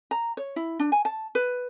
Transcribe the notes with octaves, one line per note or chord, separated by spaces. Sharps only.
A#5
C#5
E4
D4
G#5
A5
B4